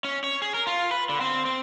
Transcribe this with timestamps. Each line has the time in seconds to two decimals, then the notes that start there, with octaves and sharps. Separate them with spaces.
0.04 C#4
0.24 C#5
0.42 G#4
0.54 A#4
0.67 F4
0.91 B4
1.09 D3
1.21 C4
1.45 C4